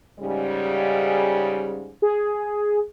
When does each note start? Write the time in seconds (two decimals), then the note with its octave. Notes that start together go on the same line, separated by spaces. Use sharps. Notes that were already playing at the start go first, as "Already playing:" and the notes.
0.19 G#2 C#3 G3
2.02 G#4